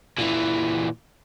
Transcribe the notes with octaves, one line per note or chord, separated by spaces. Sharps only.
A#2 E3